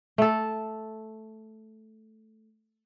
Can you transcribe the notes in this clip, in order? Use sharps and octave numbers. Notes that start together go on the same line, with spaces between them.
A3 A4